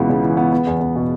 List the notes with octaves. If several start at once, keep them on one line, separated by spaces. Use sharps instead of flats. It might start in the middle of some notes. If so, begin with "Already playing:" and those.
Already playing: C#2 B2 E3 B3
C#3
E3
B3
B3
E2
E2
B2